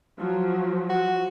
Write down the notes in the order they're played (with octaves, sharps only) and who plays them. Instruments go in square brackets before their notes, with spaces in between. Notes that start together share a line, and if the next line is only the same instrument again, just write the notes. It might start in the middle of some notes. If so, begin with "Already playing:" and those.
[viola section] F3 F#3
[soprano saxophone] F#4